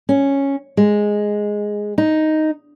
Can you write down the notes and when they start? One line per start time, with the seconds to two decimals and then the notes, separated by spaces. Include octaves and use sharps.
0.09 C#4
0.77 G#3
1.98 D#4